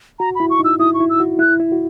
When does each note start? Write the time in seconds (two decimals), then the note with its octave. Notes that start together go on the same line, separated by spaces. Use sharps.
0.19 F#4 A#5
0.35 E4 B5
0.50 C#6
0.59 D#4
0.65 E6
0.80 E4 D#6
0.94 C#6
1.00 E4
1.10 E6
1.20 F#4
1.39 E4 F#6
1.60 E4
1.72 F#4